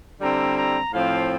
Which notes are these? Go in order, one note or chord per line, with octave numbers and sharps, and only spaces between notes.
D3 G3 C4 E4 A#5
A#5
A2 F3 C4 F5